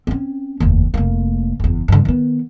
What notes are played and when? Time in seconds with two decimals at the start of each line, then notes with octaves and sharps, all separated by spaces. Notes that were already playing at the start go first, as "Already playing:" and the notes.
0.07 C4 C#4
0.60 F1 D#2
0.94 F1 A#3
1.60 F#1 E2
1.88 G2 D3
2.05 D#3 B3